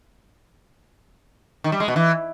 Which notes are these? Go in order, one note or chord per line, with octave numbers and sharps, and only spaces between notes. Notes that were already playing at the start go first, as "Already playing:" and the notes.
D#3
G3
G#3
B2
E3